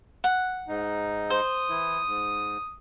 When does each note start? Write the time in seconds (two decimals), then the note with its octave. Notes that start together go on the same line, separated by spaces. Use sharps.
0.24 F#5
0.68 G#2 D#4
1.30 C5 D#6
1.70 E3 E4
2.05 G#2